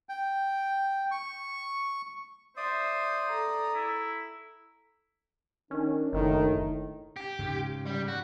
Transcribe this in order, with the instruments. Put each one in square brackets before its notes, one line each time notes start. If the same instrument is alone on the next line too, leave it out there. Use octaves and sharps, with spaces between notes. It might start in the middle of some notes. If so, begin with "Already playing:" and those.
[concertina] G5
C#6
[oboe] C5 [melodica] D5 D#6 [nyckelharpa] E5
[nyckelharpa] A4 A#5
[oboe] E4
[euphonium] D#3 [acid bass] C#4 [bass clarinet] D4
[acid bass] F#1 [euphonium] A2 [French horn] D#3
[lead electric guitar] G4
[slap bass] G#2 C#3
[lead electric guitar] G3
F#4